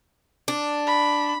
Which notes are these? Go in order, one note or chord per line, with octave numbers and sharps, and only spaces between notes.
D4
B5